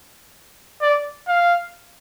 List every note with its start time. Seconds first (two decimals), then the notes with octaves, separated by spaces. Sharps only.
0.81 D5
1.28 F5